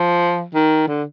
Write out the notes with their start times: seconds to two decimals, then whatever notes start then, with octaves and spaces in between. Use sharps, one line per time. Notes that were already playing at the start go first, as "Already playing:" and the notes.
Already playing: F3
0.54 D#3
0.88 D3